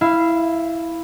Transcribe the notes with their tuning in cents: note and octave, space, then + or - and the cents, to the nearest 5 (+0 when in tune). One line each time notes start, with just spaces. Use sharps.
E4 +0 F5 -20